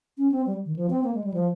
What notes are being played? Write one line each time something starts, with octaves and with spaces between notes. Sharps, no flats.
C#4
C4
G3
D#3
F3
C4
A#3
G#3
G3
F3